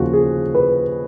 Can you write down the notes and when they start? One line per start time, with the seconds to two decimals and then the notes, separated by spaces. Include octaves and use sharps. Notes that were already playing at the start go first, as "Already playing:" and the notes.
Already playing: D#2 C#3 F3 F#4
0.13 G#4
0.55 B4